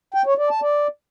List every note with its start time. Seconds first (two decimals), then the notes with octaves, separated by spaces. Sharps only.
0.14 G5
0.26 C#5
0.38 D5
0.50 A5
0.62 D5